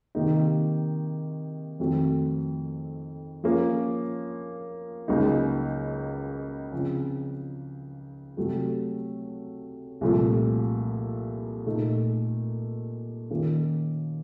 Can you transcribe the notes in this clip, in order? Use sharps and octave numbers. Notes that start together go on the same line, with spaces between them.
C3 D#3 A#3 D#4
F2 D#3 A3 C4 F#4
F3 A#3 C#4 F4 A#4
C#2 C#3 F#3 A#3 D#4
C#3 F3 C4
C3 F#3 A3
C2 A#2 F3 A3
A#2 A3 D#4
D#3 A#3 C#4 F4